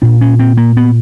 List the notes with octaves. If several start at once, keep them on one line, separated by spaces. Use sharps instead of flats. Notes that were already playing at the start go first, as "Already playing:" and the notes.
A#2 D4
C#4
C4
A#3
B3